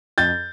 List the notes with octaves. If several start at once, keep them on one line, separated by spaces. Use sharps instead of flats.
F2 G6 A6